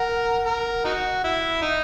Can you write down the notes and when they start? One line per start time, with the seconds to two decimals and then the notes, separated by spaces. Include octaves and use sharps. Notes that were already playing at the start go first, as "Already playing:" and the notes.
Already playing: A#4 F#5
0.46 A#4
0.85 D#4 F#4
1.24 E4
1.62 D#4